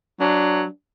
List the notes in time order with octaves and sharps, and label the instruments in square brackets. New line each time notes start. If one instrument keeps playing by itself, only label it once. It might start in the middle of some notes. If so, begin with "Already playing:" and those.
[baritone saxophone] F#3 [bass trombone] D4